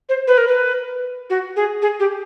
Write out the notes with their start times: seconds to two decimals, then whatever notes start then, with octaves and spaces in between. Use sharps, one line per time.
0.09 C5
0.27 B4
0.38 A#4
0.47 B4
1.30 F#4
1.56 G#4
1.82 G#4
2.00 G4